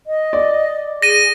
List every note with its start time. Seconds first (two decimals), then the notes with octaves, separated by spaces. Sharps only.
0.07 D#5
0.33 D5
1.02 G#4 A#6 D#7